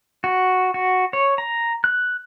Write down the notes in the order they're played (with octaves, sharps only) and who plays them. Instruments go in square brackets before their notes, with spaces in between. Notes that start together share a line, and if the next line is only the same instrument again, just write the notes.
[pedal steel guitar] F#4
F#4
C#5
A#5
F#6